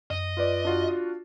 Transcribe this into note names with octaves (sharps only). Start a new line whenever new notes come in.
F#2 D#5
F4 B4 D5
D4 F4 F#4